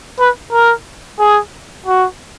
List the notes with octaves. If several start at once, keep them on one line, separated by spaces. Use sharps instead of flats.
B4
A#4
G#4
F#4